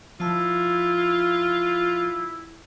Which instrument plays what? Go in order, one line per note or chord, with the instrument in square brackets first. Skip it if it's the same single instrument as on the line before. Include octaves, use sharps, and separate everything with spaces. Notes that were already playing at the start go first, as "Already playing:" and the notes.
[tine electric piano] F3 A5 [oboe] E4 [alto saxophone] F4